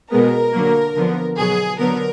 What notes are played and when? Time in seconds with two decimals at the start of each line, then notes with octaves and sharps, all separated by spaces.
0.11 B2 G#3 B3 A#4
0.52 D3 F#3 A#3
0.95 D3 F3 B3
1.37 B2 F#3 B3 G#4
1.79 D3 F#3 B3 A#4